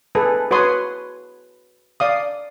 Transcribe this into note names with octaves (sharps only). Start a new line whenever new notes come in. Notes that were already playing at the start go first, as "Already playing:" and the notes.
G#4 A4 B4
F#4 B4 C#5 C6 D#6
D5 F5 D#6